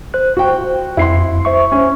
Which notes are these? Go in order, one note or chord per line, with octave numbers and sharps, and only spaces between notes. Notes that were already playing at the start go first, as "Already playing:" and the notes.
C5 F#6
F#4 G5
F2 E4 C6 C7
C5 E5 C#6
C#4